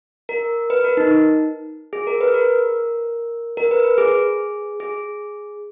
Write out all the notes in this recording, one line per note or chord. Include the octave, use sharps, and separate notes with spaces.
A#4
B4
A#4
D#4
G#4
A#4
B4
A#4
A#4
B4
B4
G#4
G#4